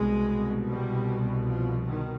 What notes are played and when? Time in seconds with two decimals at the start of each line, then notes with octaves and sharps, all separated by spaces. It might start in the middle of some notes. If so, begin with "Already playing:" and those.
Already playing: C2 B2 G#3
0.69 G3
1.48 F3
1.88 D#3